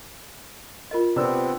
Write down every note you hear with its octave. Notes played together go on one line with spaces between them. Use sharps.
F4 A#4 D#5
C3 B3 C4 D4 E6